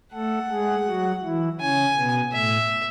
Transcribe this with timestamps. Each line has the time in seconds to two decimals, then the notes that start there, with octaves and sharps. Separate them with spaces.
0.14 A3 A4 F#5
0.50 G#3 G#4
0.86 F#3 F#4
1.23 E3 E4
1.60 C#3 C#4 G#5
1.96 B2 B3
2.32 A2 A3 E5